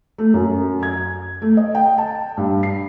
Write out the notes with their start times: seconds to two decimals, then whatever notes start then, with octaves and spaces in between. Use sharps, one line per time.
0.18 A3
0.34 F#2
0.83 G#6
1.42 A3
1.57 D#5
1.75 G5
1.98 A5
2.37 G2
2.63 C7